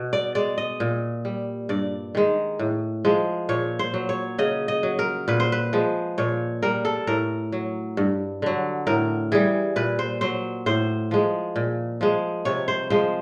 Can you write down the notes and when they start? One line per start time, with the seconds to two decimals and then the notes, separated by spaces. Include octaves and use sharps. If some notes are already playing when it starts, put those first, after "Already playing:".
Already playing: B2
0.13 D5
0.35 G#3 D5
0.58 D#5
0.80 A#2
1.25 G3
1.69 G2 D5
2.15 D#3 G#3
2.59 A2
3.05 F3 G#3
3.49 A#2 C#5
3.79 C5
3.94 F#3
4.09 C#5
4.38 C#3 D#5
4.68 D#5
4.83 F#3
4.99 A#4
5.28 A#2 B4
5.40 C5
5.52 B4
5.73 F3 G#3
6.18 A#2 C#5
6.63 G3 A#4
6.85 A4
7.07 A2 A#4
7.52 F#3
7.97 G2
8.42 D3 F#3
8.87 A2 A#4
9.32 E3 G3 G#4
9.76 A#2 B4
9.99 C5
10.21 F#3 C5
10.66 A2 C5
11.11 F3 G#3
11.56 A#2
12.01 F3 G#3
12.45 C3 C#5
12.68 C5
12.90 F3 G#3 C5